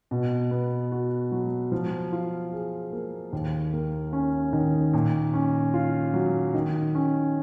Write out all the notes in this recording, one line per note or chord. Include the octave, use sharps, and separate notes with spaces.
B2
B3
F#4
F#3
F3
F4
G#4
A#3
D#2
A#3
C#4
D#3
A#2
C#4
F4
F#3
D#3
C#4